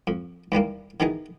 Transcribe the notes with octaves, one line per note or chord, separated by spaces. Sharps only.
F2
D#2 E3 G3 A#3
B2 D#3 E3 D#4 G#4